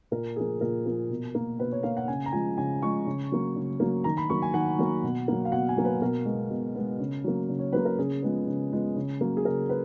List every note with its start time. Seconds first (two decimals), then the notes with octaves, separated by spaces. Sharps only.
0.11 A#2 A#4
0.36 F3 A#3 G#4
0.61 A#2 A#4
0.86 F3 A#3
1.10 B2
1.35 A#3
1.59 B2 B4
1.72 C#5
1.83 A#3 F5
1.97 F#5
2.08 C#3 G#5
2.26 A#5
2.32 F3 G#3 G#5
2.58 C#3 G#5
2.82 F3 G#3 C#6
3.06 C#3
3.32 F#3 A#3
3.56 C#3
3.80 F#3 A#3
4.04 D#3 A#5
4.17 B5
4.30 F#3 A#3 C#6
4.42 G#5
4.54 D#3 F#5
4.79 F#3 A#3
5.03 B2
5.28 F#3 A#3
5.45 F5
5.52 B2 F#5
5.69 G#5
5.77 F#3 A#3
5.85 B4
6.01 B2 A#4
6.25 G#3 B3
6.50 B2
6.75 G#3 B3
6.99 C#3
7.24 F#3 A#3
7.49 C#3
7.59 C#5
7.73 F#3 A#3 B4
7.85 A#4
7.98 C#3 G#4
8.22 F3 G#3 B3
8.47 C#3
8.72 F3 G#3 B3
8.96 C#3
9.21 F#3 A#3
9.37 G#4
9.45 C#3 A#4
9.69 B4